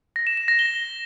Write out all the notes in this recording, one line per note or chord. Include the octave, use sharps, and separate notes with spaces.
A#6
E7
E7
A#6
G7